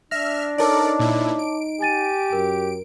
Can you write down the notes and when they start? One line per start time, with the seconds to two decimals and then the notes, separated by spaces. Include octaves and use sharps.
0.11 D4 E5 F6 A#6
0.58 D#4 A4 A#4 C#5 D5 A5 D6
0.99 A#2 E4
1.39 D7
1.81 G4 G#5 A6 D#7
2.33 F#2 A#4